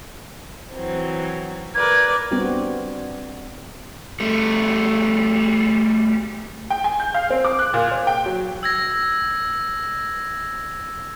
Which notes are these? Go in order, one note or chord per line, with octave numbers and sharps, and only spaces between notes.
E3 F#3 C4
A#4 B4 D5 G#6
G3 B3 C4 D4 F#4
G3 A3
G5
G#5
G6
F5
C4
D6
F#6
A#2
C5
G5
F#3
E6 G#6 A#6